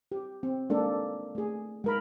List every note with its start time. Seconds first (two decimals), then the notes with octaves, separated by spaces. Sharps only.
0.12 G4
0.43 C4
0.70 G#3 A#3 D4 A4
1.35 A3 G#4
1.84 G#3 A#4 B5